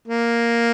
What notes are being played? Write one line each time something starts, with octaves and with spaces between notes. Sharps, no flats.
A#3